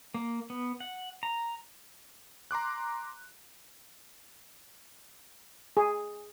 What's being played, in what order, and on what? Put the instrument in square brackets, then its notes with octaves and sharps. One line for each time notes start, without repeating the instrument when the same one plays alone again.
[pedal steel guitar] A#3
B3
F#5
A#5
[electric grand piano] A#5 C6 D6 F#6
[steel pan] G#4